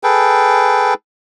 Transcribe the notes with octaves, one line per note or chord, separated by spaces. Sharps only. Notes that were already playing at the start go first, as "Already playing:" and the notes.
G#4 A4 B4 G5